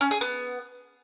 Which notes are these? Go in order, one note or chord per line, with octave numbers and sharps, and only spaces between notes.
C#4
G#4
B3